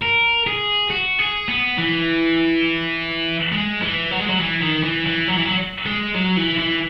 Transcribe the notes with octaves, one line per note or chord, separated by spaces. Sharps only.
A#4
G#4
F#4
G#4
B3
E3
G#3
E3
F#3
G#3
F#3
E3
D#3
E3
E3
F#3
E3
F#3
G#3
F#3
E3
E3